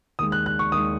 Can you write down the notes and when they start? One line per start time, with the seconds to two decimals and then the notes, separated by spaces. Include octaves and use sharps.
0.19 D#2 D#3 G#3 D#6
0.32 F#6
0.46 F#6
0.59 C#6
0.72 D#2 D#3 G#3 D#6